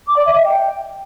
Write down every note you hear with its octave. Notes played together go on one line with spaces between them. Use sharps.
D6
D5
E5
D#5
G5